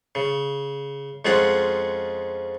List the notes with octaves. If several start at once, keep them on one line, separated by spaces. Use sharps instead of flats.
C#3
F2 G#3 C#4 F4 F#5